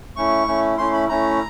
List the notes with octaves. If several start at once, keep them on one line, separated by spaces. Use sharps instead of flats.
A3 C#4 E4 C#6
A3 C#4 E4
A3 C#4 E4 C6
B5
A3 C#4 E4 A#5